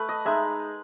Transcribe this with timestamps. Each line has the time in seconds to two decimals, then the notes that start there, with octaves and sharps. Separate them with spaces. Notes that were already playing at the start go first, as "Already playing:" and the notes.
Already playing: A3 B4
0.09 D#5
0.25 G#3 D#4 E5